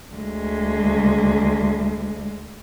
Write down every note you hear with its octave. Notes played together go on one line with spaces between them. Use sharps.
D2 G#3